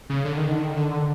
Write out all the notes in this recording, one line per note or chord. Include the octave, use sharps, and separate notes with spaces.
C#3
D3
D#3
D3
D#3
D3